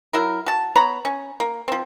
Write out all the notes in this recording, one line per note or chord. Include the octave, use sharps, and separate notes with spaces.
F#3 E4 A#4
F#4 A5
B3 C#5 A#5 B5
C#4
A#3
F3 C4